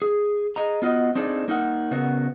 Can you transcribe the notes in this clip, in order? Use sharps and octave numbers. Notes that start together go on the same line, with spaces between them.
G#4
G#4 D#5 A#5
B3 F4 F#4 D#5
C4 D4 D#4 G#4 A4
A#3 D#4 A#4 F#5
C#3 B3 F#4 A#4